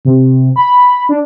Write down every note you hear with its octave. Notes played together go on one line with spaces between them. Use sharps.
C3
B5
D4